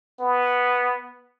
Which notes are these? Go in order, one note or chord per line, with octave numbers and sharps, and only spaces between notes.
B3